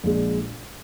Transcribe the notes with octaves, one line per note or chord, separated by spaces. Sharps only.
A#1 A#2 G#3